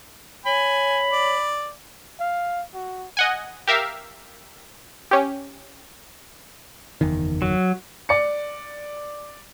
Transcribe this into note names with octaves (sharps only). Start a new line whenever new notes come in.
C#5 G#5 B5
D5
F5
F#4
D#5 F#5 G#5
G4 A#4 E5 F5
C#4 G4
F#1 E2 D#3
F#3
D5 C#7